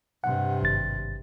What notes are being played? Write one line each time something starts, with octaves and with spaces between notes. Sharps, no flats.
G2 C3 F#5
G#1 A6